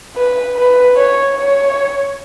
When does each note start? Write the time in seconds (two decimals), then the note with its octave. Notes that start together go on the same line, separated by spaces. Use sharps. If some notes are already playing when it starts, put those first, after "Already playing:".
0.16 B4
0.56 B4
0.96 C#5
1.36 C#5